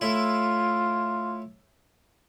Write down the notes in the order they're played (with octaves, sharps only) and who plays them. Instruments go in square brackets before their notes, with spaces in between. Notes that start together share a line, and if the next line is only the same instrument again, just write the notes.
[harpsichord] A2 E4 [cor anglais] F4